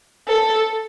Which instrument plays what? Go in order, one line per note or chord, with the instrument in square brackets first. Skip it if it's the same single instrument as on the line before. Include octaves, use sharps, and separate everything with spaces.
[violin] A4